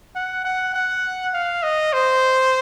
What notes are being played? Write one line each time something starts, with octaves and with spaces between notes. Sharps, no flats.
F#5
F#5
F#5
F5
D#5
C5